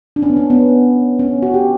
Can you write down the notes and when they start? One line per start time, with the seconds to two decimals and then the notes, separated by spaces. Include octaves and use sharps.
0.16 D4
0.22 C#4
0.30 B3
0.36 C#4
0.50 B3
1.19 C#4
1.42 F#4
1.54 G4